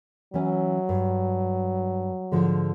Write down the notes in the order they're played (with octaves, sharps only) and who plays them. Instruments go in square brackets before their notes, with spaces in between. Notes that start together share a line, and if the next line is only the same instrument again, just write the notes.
[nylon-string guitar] E3 C#4 [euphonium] F#3
[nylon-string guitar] G2
G#2 D3 F3